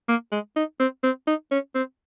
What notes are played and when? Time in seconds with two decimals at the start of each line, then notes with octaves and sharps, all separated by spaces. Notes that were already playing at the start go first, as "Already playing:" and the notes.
0.09 A#3
0.32 G#3
0.56 D#4
0.80 C4
1.03 C4
1.27 D#4
1.51 C#4
1.75 C4